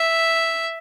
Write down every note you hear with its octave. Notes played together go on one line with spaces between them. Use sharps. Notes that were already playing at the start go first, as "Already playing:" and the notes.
Already playing: E5